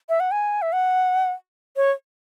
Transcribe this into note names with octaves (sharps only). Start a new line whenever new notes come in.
E5
F#5
G#5
E5
F#5
C#5